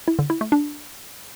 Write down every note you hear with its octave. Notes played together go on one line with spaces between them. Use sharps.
E4
D3
E4
A3
D4